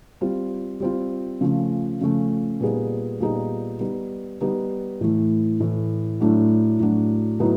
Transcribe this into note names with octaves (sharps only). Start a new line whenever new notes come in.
G3 C4 F4
G3 C4 F4
C#3 F3 A3 C#4
C#3 F3 A3 C#4
A#2 G3 B3 D#4 G#4
A#2 G3 B3 D#4 G#4
G3 B3 D#4
G3 B3 D#4
A2 E3 A3
A2 E3 A3
A2 F#3 A3 D4 F#4
A2 F#3 A3 D4 F#4
A2 F#3 B3 D#4